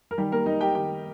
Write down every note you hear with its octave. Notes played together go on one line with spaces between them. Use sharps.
A#4
D#3 G3 G4
A#3 A#4
A#3 D#4 D#5
G4 G5
D#3 G4 G5